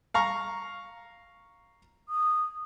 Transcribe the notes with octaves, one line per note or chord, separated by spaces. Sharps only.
F5 A#5 C#6
D#6